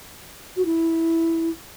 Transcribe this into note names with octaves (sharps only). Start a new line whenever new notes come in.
F#4
E4